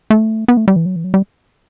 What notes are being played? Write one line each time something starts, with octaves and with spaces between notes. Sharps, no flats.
A3
B3
A3
G3
E3
F#3
E3
F#3
G3